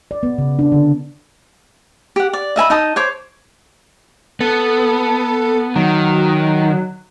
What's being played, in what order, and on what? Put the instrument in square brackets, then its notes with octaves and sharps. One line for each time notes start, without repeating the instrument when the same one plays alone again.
[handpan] D5
B3
C#3
D4
D3
[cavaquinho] G4 F#5
D5
D#5 E5 G#5 B5
D#4 D#5 A5 D#6
C5 C#5 D6
[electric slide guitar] B3 [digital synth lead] A4
[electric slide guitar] D#3 [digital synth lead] F#3